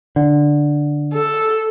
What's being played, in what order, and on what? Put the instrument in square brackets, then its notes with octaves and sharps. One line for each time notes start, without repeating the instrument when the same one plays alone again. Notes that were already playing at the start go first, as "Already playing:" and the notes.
[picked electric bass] D3
[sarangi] A4